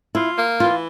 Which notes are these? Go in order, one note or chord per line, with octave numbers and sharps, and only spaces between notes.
E4 F4
A#3
E3 F4